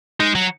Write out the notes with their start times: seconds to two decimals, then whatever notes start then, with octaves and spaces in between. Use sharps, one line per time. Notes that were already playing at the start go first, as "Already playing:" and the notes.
0.20 G#3 D#4
0.35 F#3